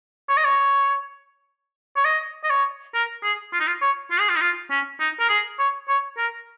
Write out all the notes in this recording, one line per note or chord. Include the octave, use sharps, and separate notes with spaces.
C#5
D#5
C#5
C#5
D#5
D#5
C#5
A#4
G#4
F4
D#4
F4
C#5
F4
G#4
F4
D#4
F4
C#4
D#4
A#4
G#4
C#5
C#5
A#4